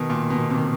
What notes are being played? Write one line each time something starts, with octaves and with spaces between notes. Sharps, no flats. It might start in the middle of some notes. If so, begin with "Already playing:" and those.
Already playing: B2 D#3
A#2
B2
C3